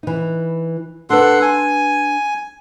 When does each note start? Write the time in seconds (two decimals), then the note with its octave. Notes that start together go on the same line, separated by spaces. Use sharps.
0.03 E3 D#4
1.10 D4 A4 B4 F#5 C6
1.41 G#5